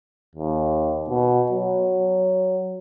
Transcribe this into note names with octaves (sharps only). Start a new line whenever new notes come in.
D#2
B2
F#3